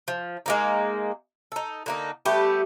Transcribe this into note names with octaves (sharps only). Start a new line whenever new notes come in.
F3
G#3 A#3 D#4
D#4 A4
D3 A#3 D#4
G3 A3 B3 G4